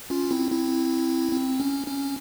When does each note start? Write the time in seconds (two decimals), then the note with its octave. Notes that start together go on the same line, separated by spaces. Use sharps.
0.10 C#4 F4
0.31 C4 E4
0.51 C4 E4
1.33 C4
1.60 C#4
1.87 C#4